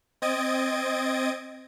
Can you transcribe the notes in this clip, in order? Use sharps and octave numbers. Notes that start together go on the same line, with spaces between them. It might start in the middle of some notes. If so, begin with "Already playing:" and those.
C4 D#5 D#6 G#6 A6 D7